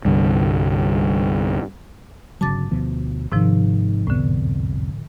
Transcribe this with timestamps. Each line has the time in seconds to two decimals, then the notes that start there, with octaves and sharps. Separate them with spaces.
0.05 C2 G2 D3
2.41 G1 C#3 F#3 A5 D6 A6
2.71 D2 B2 F3
3.32 G#1 G#2 C3 D#3 F3
4.07 C2 F2 A2 D3 B3